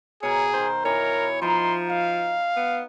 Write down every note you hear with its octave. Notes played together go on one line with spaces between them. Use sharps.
B2 G#4 A#4 C#5
D#3 C5
E3 E4 A#4 C#5 D#5
F3 D#4 A#5 C6
D#5 F5
B3